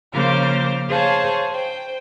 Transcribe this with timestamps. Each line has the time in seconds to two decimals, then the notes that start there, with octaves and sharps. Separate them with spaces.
0.13 C#3 F3 A#3 C5 D6 F6
0.89 G#4 C5 C#5 F5 A5
1.50 C5 G5